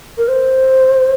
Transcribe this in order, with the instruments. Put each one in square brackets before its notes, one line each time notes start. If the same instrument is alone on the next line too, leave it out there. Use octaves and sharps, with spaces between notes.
[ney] A#4
C5